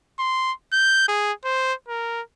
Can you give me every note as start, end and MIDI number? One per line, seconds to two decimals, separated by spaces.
0.19 0.52 84
0.72 1.06 91
1.08 1.32 68
1.44 1.74 72
1.88 2.21 70